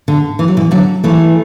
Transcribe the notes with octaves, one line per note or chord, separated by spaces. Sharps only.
D3
E3
F#3
B2 E3
D3 F#3
E3 A3